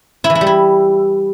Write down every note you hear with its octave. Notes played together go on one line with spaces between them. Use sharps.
E4
E3
E4
G3
E4